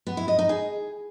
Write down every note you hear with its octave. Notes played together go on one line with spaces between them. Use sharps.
B3
E4
D#5
D#4
G#4